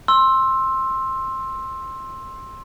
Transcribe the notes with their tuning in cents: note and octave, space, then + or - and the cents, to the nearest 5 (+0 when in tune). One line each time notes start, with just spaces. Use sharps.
C6 +15 E6 +0